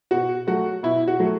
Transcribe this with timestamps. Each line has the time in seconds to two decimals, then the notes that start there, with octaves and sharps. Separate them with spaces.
0.11 B2 F#4
0.47 F#3 A3 F#4
0.83 B2 E4
1.08 F#4
1.19 F#3 A3